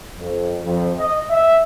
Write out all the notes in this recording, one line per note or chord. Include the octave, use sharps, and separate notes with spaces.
F2
F2
D#5
E5